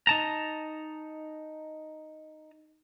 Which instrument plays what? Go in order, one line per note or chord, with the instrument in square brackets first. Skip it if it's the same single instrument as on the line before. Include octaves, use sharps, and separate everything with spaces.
[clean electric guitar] D#4 A5 A#5